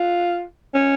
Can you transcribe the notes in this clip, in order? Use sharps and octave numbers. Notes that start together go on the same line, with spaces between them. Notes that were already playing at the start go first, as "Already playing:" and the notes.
Already playing: F4
C#4